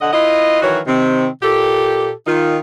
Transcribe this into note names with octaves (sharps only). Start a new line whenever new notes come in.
D3 D#5 F#5
E4 F4 B4 D#5
D#3 E3 F#3 F#4 A#4 C#5
C3 D#3 C4
A#2 G4 A4
D#3 D#4 F4